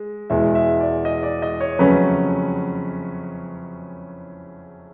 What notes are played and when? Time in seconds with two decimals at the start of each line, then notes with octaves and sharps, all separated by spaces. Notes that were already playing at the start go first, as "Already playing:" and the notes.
Already playing: G#3
0.30 E2 B2 G#3 E5
0.55 E5
0.80 D5
1.05 D#5
1.23 D5
1.42 D#5
1.60 C#5
1.79 F2 C#3 F#3 A3 C#4 B4